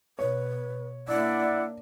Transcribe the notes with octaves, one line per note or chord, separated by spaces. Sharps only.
B2 B4 C#5
A#3 D4 E4 D5 E5 F#5